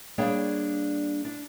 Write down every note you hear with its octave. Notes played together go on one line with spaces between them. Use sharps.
G3 A#3 D4 G#4 C#5 G5
D4